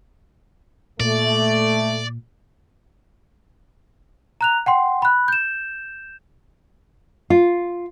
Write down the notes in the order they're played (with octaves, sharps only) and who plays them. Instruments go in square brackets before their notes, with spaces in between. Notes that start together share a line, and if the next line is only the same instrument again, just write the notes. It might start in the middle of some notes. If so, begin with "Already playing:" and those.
[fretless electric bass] A#2 [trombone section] A3 [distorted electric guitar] D5
[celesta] A#5 F#6 F7
F#5 G5 C6
B5 F#6
G6 E7
[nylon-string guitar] F4